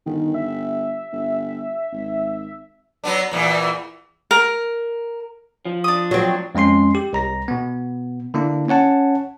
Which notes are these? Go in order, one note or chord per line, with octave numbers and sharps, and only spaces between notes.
G1 D#3
E5
G1
G#1
F#3 B3 D4
E2 A#2 E3
A#4
F3
D4 D#6
F#3 C4
F2 G#3 C#4 C6 C7
G4
C2 A#5 A#6
B2 B3
D3 A#3 D4 E4
C#4 C#5 F#5 A5